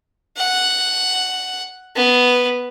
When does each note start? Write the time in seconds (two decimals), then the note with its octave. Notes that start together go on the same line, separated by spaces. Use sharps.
0.37 F#5
1.96 B3